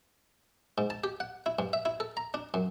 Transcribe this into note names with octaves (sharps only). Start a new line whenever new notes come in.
G#2
A5
G4
F#5
E4
G2
E5
E4
A4
A#5
D4
F#2